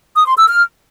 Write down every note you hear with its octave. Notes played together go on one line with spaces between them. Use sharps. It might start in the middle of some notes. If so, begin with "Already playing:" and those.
D#6
C6
E6
F6